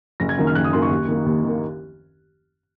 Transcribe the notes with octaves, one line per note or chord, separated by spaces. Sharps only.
F#1 A#6
G#6
F#2 D#3 A#3
F6
F#1 F#6
D#6
F#2 D#3 A#3 C6
C#6
D#2
D#3 A#3
D#2
D#3 A#3